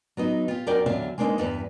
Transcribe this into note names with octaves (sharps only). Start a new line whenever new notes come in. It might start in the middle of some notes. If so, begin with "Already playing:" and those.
F#3 B3 D#4
F4 G4
F#2 D4 F#4 A#4 D5 G5
E2 D3 F#3 G3 E5 F5
G#3 A#3 B3 D4 D#4 C5
E2 G2 B4